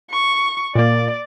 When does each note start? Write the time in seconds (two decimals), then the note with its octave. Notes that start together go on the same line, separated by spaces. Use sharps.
0.11 C#6
0.75 A#2 A#3 D5